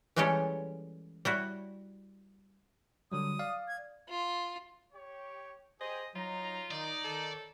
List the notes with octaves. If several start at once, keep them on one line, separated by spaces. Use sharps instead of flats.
E3 G3 G#3 C#4 G4 A4
G3 E4 F#4
D3 F#3 G3 D#6
D5 F5
G#6
F4
G4 C#5
G4 G#4 C5 D#5
F#3 D#4 F4 A#5
D#3 D#4 D5
D#3 A4